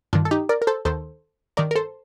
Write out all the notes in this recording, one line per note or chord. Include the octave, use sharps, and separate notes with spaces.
G2 D#3 D4 F4
A4
D#4 G4
A#4 D5
A#4
A4 C5
D#2 D#3 A4 C5
G2 D#3 A#4 D5
A#4
A4 C5